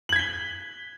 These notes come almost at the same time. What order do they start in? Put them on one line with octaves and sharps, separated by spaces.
F#7 G#6 B6 G7